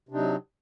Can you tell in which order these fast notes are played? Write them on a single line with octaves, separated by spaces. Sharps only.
C3 D4 D#4 F#3